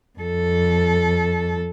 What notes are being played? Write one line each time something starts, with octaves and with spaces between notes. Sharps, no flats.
F2 A4